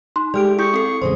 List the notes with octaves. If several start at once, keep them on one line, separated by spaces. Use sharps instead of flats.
D#4 C6
G#3 A3 G4 D5 F6 D7
E4 G#4 C#6 D#6 G6
C4 A4
E2 C#3 G#3 C5 C6